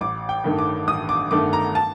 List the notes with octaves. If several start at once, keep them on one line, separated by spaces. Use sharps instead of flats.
A1 D6
G5
G2 D#3 A3
D6
A1 D#6
D6
G2 D#3 A3 D6
A#5
A5